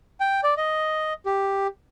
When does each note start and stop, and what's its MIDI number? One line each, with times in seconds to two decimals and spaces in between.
0.20 0.41 79
0.43 0.54 74
0.57 1.13 75
1.26 1.67 67